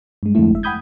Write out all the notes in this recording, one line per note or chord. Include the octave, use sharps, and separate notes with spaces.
G2 G#3
F2 D3 G#3 A3 E4
G1 E5
F#5 G5 B5 D#6 G6 G#6